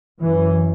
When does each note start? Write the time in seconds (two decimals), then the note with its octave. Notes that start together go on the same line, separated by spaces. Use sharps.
0.20 F#2 E3